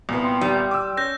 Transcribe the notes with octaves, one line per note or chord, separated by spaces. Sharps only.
C2 A#2 B3
G5 C6
G3
D6 E6
C#4 G6 A#6